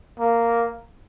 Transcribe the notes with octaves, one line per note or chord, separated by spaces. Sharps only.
A#3